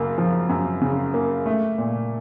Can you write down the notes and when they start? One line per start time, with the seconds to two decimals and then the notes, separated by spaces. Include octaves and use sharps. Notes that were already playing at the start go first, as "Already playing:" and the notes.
Already playing: F#2 C#3 A#3
0.18 F3
0.49 F#2
0.81 C#3
1.14 A#3
1.46 A3
1.78 A#2